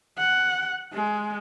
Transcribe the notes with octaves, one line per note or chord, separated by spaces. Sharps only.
F#5
G#3